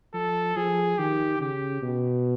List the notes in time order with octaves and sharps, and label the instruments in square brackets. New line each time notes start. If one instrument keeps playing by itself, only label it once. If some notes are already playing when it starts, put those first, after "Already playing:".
[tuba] F3 [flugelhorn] A4
[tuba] F3 [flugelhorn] G#4
[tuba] D#3 [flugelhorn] G4
[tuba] C#3 [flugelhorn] G4
[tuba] B2